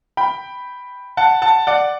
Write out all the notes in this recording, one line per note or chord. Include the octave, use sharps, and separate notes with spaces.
G5 B5
F#5 A5
F#5 A5
D5 F#5